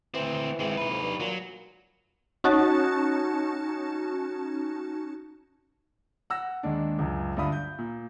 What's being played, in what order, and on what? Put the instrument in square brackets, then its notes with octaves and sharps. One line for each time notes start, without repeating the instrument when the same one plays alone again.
[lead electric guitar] D2 C4 [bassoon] E3
[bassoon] E3 [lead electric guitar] G#3 C4
[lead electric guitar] D#4 B4
[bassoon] F2
G2
[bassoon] A#2 [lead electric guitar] F#3
[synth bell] C#4 D#4 F#4 A5
[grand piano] F#5 E6 A#6
D#2 G#3 D4
C#2 F#2
D2 G2 D4 F4 B5 D#6
G6
A#2